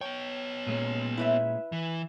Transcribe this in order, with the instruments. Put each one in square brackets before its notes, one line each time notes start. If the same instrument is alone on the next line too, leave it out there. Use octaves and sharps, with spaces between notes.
[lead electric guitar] B3 C#5 [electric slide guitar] G5
[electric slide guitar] A#2 G#3 C#4
[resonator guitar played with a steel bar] E4 B4 E5
[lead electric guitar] E3